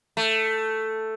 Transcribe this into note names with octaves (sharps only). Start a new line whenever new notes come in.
A3